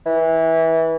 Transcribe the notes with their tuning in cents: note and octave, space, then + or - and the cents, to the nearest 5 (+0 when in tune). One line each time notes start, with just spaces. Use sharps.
E3 -20